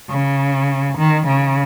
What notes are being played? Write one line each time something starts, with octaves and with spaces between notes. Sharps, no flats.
C#3
D#3
C#3